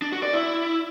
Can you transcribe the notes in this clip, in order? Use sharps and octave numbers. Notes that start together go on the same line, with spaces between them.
D4
F#4
D5
E4